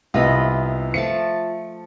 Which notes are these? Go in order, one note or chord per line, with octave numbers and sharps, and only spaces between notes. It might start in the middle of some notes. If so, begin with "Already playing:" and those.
C2 C3 B3 F4 D#5 B5
F3 A3 A5 C#7